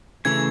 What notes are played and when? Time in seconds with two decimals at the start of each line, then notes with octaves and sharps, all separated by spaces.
0.25 C#3 E3 A3 G#6